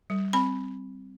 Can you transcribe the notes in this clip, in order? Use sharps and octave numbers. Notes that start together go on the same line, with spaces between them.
G3
C4 B5